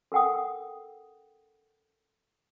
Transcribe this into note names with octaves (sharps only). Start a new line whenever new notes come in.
A4 A#4 F#5 G5 D#6